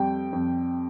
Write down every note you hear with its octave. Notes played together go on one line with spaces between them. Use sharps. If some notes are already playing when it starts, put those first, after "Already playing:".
Already playing: F2 G3 G5
F2